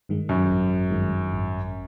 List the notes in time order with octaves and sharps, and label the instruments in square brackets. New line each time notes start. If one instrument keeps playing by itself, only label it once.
[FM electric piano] G2 D#3 G#3
[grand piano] F#2
[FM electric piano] G#1
G2 D#3 G#3
G#1